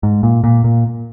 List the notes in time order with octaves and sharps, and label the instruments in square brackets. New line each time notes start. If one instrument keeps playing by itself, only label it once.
[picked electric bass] G#2
A#2
A#2
A#2